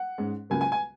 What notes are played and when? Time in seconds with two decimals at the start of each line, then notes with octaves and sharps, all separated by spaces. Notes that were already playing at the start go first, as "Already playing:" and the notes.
Already playing: F#5
0.18 G#2 G#3 C#4
0.50 C#2 C#3 F#3 A#3 G#5
0.61 G#5
0.72 G#5